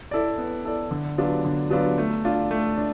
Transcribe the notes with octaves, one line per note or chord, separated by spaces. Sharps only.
E4 A4 D5
B3
E4 A4 D5
D3
F#3 B3 D4 F4
D3
F#3 B3 D4 F4
A3
D4 F4
A3
D4